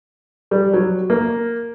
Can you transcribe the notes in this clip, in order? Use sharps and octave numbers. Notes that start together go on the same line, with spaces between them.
G3
F#3
A#3